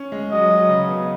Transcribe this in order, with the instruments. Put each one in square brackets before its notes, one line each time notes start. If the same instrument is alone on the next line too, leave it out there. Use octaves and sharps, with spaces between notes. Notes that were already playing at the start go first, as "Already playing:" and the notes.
Already playing: [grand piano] C#4
G#3
[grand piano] F#3 [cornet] D#5
[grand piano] F#3
C#3
B3